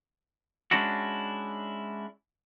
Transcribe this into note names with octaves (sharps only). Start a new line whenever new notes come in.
G#3 C#4 D4 E4 F#4